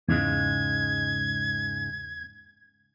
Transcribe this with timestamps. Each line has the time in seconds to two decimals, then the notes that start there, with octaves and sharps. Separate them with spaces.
0.09 E2 G#2 C#3 G#3 G#6